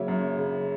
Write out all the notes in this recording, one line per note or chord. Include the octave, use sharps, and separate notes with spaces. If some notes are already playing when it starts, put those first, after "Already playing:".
Already playing: C#3 F#3 A#3 C#5 E5
F#2
C#3